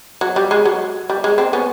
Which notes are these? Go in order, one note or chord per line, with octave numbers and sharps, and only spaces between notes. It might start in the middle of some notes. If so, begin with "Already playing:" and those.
F#3
G3
G#3
F#3
G3
G#3
C4
B3 C#4